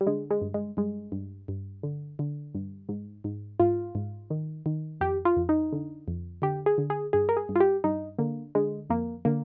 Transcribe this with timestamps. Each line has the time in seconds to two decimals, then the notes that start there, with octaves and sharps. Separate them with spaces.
0.01 G3
0.07 D3 G#3
0.31 G#3
0.41 G2
0.54 G#3
0.77 G2 G#3
1.12 G2
1.48 G2
1.83 D3
2.19 D3
2.55 G2
2.89 G#2
3.24 G#2
3.59 G#2 F4
3.95 G#2
4.30 D#3
4.66 D#3
5.01 F2 G4
5.25 F4
5.37 F2
5.49 D#4
5.72 D3
6.08 F2
6.42 D3 G4
6.66 G#4
6.78 D3
6.90 G#4
7.13 G2 G#4
7.29 A#4
7.37 G#4
7.49 G2
7.56 F4
7.60 G4
7.84 G2 D#4
8.19 D3 A#3
8.55 D3 G#3
8.90 F2 A#3
9.25 D3 A#3